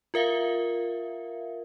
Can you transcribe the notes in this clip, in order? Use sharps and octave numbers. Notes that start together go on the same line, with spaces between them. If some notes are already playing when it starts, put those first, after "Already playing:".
F4 A#4 E5 F5